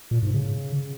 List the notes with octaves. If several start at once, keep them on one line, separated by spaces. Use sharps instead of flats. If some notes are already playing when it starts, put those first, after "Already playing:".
A#2
G#2
C#3